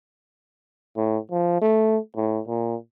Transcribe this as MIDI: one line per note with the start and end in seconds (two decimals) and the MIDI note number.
0.97 1.18 45
1.31 1.58 53
1.61 1.98 57
2.16 2.40 45
2.48 2.75 46